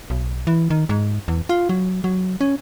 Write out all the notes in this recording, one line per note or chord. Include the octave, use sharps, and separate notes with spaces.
B1
E3
D#3
G#2
E2
F4
F#3
F#3
C#4